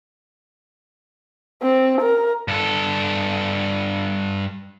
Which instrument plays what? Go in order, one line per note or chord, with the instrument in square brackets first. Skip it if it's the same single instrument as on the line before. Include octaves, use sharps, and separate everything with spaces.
[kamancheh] C4
A#4
[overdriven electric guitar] G2 A4